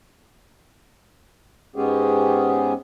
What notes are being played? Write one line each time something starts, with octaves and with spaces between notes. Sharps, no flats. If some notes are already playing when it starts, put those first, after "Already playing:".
G#2 G#3 B3 C#4 G4 G#4